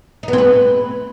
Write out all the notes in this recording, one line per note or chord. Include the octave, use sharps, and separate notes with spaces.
D#4
B3
C4
B4